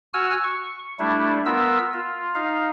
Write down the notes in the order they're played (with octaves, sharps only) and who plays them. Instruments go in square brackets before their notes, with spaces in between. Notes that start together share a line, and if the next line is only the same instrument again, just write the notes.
[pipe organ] F#4 F#5 G#5 E6 F6
C#6
G3 A3 D4 E4
B3 F4 A#4 E6
F4
D#4 F5